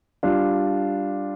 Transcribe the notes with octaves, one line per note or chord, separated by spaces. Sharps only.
G3 D4 F4